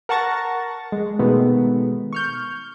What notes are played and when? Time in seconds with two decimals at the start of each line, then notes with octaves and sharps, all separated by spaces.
0.09 A#4 F#5 A5 C#6 A6 A#6
0.92 G#3
1.19 B2 D#3 G#3 A3 B3
2.13 C#6 F6 G6